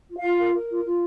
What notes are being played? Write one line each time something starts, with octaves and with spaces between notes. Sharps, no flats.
F4
F5
F4
A#4
A#4
F4
F4